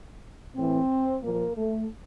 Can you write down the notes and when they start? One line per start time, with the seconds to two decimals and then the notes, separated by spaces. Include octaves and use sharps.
0.57 A2 E3 C4
1.23 A#2 F3 A#3
1.57 A3